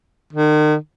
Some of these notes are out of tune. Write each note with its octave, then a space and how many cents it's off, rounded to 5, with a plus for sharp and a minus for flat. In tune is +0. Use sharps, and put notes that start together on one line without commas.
D#3 -40